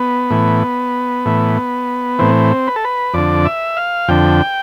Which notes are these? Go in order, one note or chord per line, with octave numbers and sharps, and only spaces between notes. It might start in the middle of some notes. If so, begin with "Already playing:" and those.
Already playing: B3
A2 E3
A2 E3
A2 E3 C4
B4
A4
B4
F2 D3 D5
E5
F5
F2 D3 G5